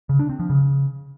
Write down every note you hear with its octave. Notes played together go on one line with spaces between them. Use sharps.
C#3
D4
C4
F3
C#3